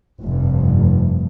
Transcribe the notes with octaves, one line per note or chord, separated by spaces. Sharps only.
F1 G2